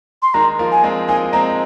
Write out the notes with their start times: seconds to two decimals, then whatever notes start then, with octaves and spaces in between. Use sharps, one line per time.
0.22 C6
0.34 D#3 G#3 A#5
0.59 F3 A#3
0.72 G#5
0.84 G#3 C4
1.08 A#3 D#4 G#5
1.33 G#3 C4 A#5